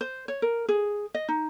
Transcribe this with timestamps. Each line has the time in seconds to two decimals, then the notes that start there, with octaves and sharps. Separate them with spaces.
0.01 C5
0.28 C#5
0.42 A#4
0.69 G#4
1.15 D#5
1.28 D#4